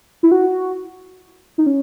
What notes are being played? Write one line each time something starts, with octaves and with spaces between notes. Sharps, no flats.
E4
F#4
D#4
C#4